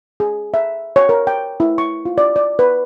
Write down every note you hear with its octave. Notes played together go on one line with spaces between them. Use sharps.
G#4
E5
C#5
A#4
G5
E4
C#6
F4
D5
D5
B4